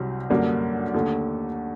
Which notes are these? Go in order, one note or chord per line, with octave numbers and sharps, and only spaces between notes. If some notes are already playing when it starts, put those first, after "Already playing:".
Already playing: C2 C3 F#3 C4
F#2 D3 G3 A#3 D4
D#2 D3 A3